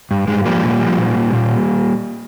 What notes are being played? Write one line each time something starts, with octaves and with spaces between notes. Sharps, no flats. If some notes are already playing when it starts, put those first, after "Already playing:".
G2
G2 G#3
F3 G3 A#3
A#2
F3
A#2
A#2
A#2